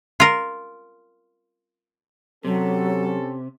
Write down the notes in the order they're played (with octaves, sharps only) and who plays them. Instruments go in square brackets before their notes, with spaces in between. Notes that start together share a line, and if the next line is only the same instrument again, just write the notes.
[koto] F4 A#4
[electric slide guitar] C3 [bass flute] F#3 [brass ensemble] C#4 G4 A4